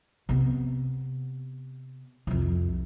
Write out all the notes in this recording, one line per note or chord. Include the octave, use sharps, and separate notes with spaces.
C3 B3
C2 F2